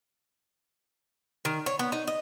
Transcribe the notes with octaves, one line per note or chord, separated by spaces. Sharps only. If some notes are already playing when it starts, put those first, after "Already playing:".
D#3
C#5
B3
D#4
D#5